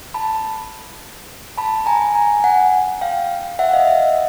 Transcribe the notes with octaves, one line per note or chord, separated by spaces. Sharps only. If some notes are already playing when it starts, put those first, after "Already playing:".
A5 B5
A5 B5
G#5 A#5
G#5 A#5
F#5 G#5
F5 G5
E5 F#5
D#5 F5
E5 F#5